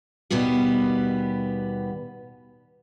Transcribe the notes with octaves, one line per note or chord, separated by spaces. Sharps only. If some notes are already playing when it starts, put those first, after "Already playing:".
D#2 B2 G3 B3 G4